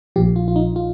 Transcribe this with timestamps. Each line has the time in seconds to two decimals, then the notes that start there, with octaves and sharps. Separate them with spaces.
0.16 A#1 A#2 F3 G4
0.36 F4
0.48 F4
0.56 D#4
0.76 F4